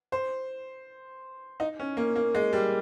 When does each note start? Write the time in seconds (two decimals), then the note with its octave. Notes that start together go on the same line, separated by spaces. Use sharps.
0.12 C5
1.60 D#4
1.80 C#4
1.97 A#3
2.16 A#3
2.35 G#3
2.53 G3